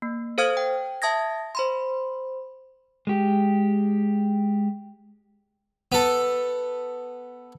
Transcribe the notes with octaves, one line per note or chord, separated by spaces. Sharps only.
A#3
A4 C5 F5 D#6 F6 G#6
G5
E5 A5 D#6 G#6 A#6
C5 B5 C6
G#3 G4
B3 A4